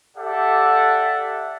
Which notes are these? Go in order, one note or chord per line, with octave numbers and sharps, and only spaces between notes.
G4 A4 D5 E5 F#5